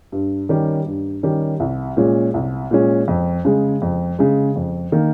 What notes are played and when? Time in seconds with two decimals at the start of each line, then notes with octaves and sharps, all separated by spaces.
0.12 G2
0.49 D#3 G3 C#4 G4
0.86 G2
1.23 D#3 G3 C#4 G4
1.60 C2
1.97 A#2 G#3 C#4
2.34 C2
2.71 A#2 G#3 C#4
3.08 F2
3.45 C#3 G#3
3.82 F2
4.19 C#3 G#3
4.56 F2
4.92 D#3 A#3